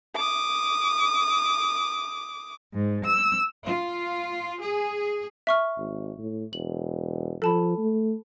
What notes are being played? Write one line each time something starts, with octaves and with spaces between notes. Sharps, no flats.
D6 D#6
G#2
E6
F4
G#4
E5 C#6 F6
G#1
A2
E1 F#7
F3 A4 A5 B5
A3